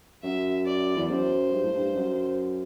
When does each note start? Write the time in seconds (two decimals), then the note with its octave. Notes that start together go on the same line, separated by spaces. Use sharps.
0.23 F#2 E5
0.66 D5
0.96 E2
1.09 F#2 C5
1.53 G2
1.64 A2
1.74 G2
1.96 F#2